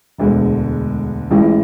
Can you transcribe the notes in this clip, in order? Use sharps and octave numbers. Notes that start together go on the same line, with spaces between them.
E1 D2 D3 G#3 B3
A1 A2 G#3